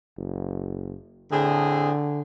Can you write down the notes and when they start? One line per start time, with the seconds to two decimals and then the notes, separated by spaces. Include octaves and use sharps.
0.18 F#1
1.32 A2 D3 C4 G#4